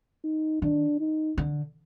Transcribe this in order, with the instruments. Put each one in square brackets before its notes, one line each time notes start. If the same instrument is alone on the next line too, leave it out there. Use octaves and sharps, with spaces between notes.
[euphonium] D#4
[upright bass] D#3 [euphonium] D4
[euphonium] D#4
[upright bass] D3